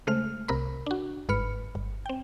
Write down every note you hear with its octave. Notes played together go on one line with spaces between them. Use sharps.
C#3 G#3 A3 C5 F6
C2 C3 A#4 B5
D4 F#4
G1 G#2 B4 B5 F6 C#7
G1
C4 G5